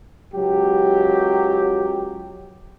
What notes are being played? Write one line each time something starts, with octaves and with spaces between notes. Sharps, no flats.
C#2 F#3 G4